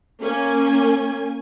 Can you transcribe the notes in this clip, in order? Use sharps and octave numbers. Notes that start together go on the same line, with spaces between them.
A#3 C#4 G#5